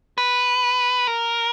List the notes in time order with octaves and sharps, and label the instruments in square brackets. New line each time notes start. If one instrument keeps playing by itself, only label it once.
[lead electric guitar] B4
A#4